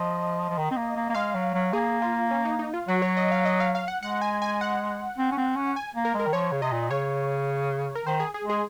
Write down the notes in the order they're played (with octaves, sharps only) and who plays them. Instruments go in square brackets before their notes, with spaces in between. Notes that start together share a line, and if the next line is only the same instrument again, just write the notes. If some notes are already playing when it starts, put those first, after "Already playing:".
Already playing: [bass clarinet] F3 [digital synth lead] D#5
[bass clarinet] F3
D#3
C4
A#3
A#3
A#3
[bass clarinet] G#3 [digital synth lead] F5
[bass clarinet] F#3
F#3
[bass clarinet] A#3 [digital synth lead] G#4
[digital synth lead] F4
C#4
D#4
D#4
F4
[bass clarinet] F#3 [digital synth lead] F#4
[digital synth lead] C#5
D#5
F5
D#5
F5
F5
F#5
[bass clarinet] G#3 [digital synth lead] F#5
[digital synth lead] G#5
G#5
F#5
[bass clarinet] C4
C#4
C4
C#4
[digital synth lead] G#5
[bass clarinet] A#3
[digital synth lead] A#4
[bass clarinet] G#3
[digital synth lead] A#4
[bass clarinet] D#3
[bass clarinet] F3 [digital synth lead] C#5
[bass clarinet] C#3
[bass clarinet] C3 [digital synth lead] D#5
[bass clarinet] A#2
[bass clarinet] C#3 [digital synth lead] C#5
[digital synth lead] A#4
[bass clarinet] D#3 [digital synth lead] C5
[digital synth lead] G#4
G#4
[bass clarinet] G#3
[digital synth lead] G#4